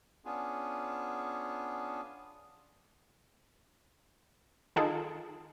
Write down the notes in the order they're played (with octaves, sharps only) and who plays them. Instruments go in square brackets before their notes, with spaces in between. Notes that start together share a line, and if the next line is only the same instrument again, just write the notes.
[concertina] B3 C#4 D4 F4 G#4
[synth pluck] D#3 D#4 F4 G#4 A4